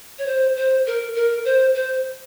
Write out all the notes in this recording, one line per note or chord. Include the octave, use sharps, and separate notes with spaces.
C#5
C5
C5
A#4
A#4
C5
C5